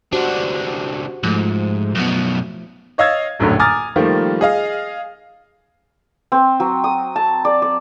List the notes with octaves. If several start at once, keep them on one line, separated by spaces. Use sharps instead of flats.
C#2 D4 F#4 G4 C5
G#2 F3 A3
F#2 B2
C#5 D#5 F5 E6 G#6 A6
D#1 A#1 F#2 A2 D3 F#3
G#5 A#5 D6 D#6 F6 A6
D#3 F3 G3 A3 A#3 F4
G#4 D#5 F5
C4
F#3
D#6
A5
D5
D5